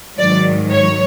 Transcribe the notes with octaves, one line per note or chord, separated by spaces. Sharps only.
G#2 D#3 F#3 D5
C#5